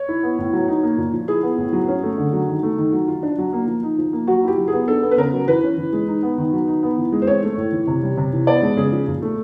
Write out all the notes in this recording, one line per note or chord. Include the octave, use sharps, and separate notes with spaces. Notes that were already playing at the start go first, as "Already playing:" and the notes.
Already playing: C#5
E4
B3
A2
F#3
D#4
A#3
A#2
F3
E4 G#4
B3
A2
F#3
C#4
A3
D3
F#3
D#3
A3
D#3
F#3
F4
D4
F#3
A#3
F3
D#4
F3
A#3
F#3 F#4
E4 G4
F#3
G#4
B3
D4 A4
B3
B4
C#3 A#4
F#3
E3 B4
C#4
E3
G#3
D#4
B3
D#3
F#3
D#4
B3
E3
G#3
C5
C4 C#5
A3
A2
E3
C3
G3
C3
E3
B3 D5
G#3
C#3 G#4
F3
A#2
A3